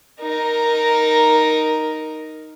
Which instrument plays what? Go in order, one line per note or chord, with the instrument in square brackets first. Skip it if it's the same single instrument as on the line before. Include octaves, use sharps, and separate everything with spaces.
[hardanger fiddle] D#4 A#4